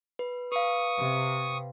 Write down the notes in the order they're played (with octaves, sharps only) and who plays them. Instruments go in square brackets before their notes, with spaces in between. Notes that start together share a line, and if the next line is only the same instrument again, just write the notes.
[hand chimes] B4
[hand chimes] B4 F5 [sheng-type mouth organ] C#6 D#6
[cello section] C3